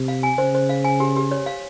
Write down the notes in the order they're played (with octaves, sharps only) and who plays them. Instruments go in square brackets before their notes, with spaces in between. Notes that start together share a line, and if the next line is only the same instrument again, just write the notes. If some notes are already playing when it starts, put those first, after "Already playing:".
Already playing: [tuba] C3
[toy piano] F5
G#5
[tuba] C#3 [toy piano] C5
[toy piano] C5
F5
G#5
G4
G4
C#5
F5